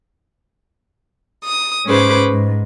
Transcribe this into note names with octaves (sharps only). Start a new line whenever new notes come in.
D#6
G#2 C#4 G#4 B4 C5 D6
G#2